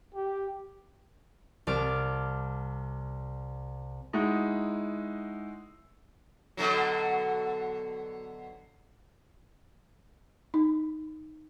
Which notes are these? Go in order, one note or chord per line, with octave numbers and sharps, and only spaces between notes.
G4
C2 A5 D6 F6
G#3 D#4 E4 F#4
B2 D3 F#3
D#4